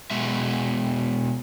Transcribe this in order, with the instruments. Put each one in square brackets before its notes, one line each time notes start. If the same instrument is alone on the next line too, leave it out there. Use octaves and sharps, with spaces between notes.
[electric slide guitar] B2 G#3 E5